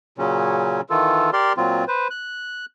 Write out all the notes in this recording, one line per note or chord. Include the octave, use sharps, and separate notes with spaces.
A#2 C#3 F#3 C#4
D#3 E3 F4 A4
G4 A#4 D5 C6
A#2 F#3 C4 F4
B4 C5
F#6